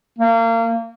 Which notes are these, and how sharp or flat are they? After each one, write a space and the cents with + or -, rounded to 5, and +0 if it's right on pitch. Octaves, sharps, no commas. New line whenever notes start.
A#3 -30